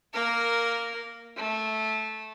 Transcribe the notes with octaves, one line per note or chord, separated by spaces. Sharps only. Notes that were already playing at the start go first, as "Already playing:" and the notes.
A#3 A#4
A3